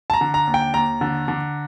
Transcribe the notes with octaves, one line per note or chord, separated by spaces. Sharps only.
A5
A#5
D3
A#5
D#2
G5
D#2 A#5
D3
D3